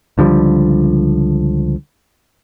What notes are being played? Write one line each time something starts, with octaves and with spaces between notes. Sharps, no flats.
C#2 D3 F3 G3